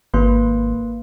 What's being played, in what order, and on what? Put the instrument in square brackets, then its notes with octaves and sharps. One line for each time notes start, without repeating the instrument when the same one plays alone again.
[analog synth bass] G#1 [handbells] A#3 B4 C6